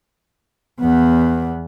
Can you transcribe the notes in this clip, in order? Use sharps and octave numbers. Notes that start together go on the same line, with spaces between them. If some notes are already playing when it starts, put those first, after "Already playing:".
E2 B3